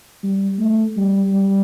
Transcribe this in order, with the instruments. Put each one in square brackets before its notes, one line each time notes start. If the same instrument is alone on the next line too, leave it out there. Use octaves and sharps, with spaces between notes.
[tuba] G3
A3
G3
G3